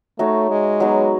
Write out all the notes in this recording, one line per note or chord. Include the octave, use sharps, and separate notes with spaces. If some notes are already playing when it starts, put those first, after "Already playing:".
A3 D#4 F#4 C#5 E5
G#3
F#3 B3 D#4 G#4